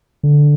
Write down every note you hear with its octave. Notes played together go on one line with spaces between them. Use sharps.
D3